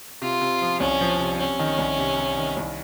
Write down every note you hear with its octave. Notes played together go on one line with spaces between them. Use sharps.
C3 F4
C3
F3
C2 C#4
F3
C3
C3 C#4
D#3
C2
C3
C3
D#3
C2